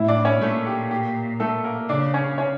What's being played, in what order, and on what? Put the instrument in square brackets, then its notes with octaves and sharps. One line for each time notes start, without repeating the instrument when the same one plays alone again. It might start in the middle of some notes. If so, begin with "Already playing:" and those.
Already playing: [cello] A2 [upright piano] E4 E5
[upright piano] D4 D5
C#4 C#5
[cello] A#2 [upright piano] A3 A4
[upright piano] G4
G4
A3 A4
A#3 A#4
[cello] C#3 [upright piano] D4 D5
[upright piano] C#4 C#5
C#4 C#5